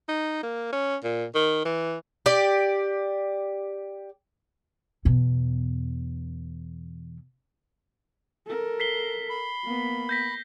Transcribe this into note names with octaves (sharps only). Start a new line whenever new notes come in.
D#4
A#3
C#4
A#2
D#3
E3
G4 D5
E2 B2
A4 A#4
B6 C7 G7
B5
A#3 B3
G6 A#6 B6